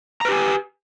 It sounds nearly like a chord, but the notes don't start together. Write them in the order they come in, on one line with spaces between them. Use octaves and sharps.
A#5 B4 G4 G#5